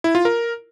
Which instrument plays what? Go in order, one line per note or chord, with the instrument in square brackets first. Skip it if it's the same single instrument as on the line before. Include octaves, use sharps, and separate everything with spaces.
[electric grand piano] E4
F4
A#4